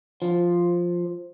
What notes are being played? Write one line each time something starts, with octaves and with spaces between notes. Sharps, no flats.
F3